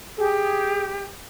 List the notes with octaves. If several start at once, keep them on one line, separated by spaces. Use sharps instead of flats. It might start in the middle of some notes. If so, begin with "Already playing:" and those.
G4 G#4